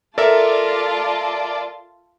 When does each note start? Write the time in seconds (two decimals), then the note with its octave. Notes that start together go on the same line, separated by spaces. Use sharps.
0.18 F4 A4 A#4 D5 E5 A5